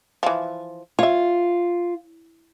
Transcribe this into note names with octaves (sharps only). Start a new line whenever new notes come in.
E3 F3
F4 C#5 E5